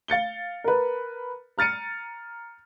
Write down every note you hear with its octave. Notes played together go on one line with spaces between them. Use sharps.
F5 A6 C#7 G7
A#4 B4
A#5 F6 A6 C#7 D#7